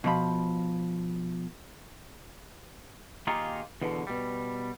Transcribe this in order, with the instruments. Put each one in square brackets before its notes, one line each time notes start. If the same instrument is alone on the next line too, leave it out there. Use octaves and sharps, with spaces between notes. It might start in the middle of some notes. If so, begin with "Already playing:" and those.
[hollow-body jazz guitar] B2 F3 B5
[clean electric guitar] D#3 A#3 D#4 F4 G4 G#4
E2 B2 D3
B2 G3